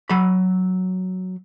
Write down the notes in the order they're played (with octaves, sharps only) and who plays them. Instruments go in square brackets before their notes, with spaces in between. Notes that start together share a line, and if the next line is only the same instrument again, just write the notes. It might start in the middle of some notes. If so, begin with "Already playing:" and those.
[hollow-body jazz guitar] F#3 B5